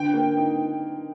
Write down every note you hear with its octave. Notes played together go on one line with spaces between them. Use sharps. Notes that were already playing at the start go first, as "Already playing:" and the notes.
Already playing: D3 G5
A#3
D#4